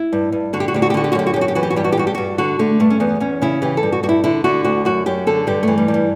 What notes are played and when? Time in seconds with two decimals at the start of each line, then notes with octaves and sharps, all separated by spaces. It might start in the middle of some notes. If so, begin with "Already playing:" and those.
Already playing: E4
0.13 G2
0.32 G2
0.53 D3 F#4
0.60 G4
0.68 F#4
0.74 D2 G4
0.82 F#4
0.90 G4
0.94 D3 F#4
1.04 G4
1.12 F#4
1.15 F#2 G4
1.27 F#4
1.34 G4
1.36 F#2
1.41 F#4
1.48 G4
1.55 E3 F#4
1.63 G4
1.70 F#4
1.76 G2 G4
1.84 F#4
1.92 G4
1.97 G2 F#4
2.07 G4
2.15 G2 F#4
2.38 D3 F#4
2.59 D3 A3
2.80 G2 A3
2.90 C#4
3.00 E2 B3
3.20 E2 C#4
3.42 C#3 E4
3.62 E3 G4
3.77 A4
3.83 G2
3.92 F#4
4.03 G2 F#4
4.09 E4
4.24 D3 E4
4.44 D3 F#4
4.64 D2 F#4
4.85 F#2 F#4
5.06 F#2 G4
5.27 D3 A4
5.47 G2 G4
5.63 E3 A3
5.78 G3
5.88 G2
5.94 G3